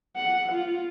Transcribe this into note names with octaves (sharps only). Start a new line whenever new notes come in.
F#5
F4